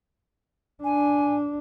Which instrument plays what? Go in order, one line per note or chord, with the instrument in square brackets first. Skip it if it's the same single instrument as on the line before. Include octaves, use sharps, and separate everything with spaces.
[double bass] D4 [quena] G#5